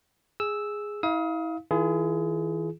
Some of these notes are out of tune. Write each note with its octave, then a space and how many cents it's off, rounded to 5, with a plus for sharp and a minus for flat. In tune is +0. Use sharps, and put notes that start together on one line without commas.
G#4 +0 E6 -5
E4 -35 F5 +0 D#6 +35
E3 -40 F4 -45 G#4 +20